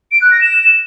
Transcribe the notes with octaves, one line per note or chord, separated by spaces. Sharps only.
D7
F#6
A#6
E7